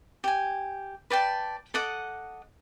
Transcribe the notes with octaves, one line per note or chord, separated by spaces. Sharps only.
G4 G#5
B4 D5 G5 A5
A4 D#5 F#5 D6